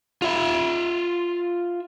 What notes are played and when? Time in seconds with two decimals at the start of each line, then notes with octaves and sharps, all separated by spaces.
0.22 F4 E5